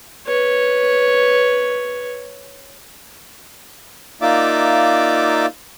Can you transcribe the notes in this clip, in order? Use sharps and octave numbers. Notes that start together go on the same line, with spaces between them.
B4 C#5
A#3 D#4 F4 D5 E5 D6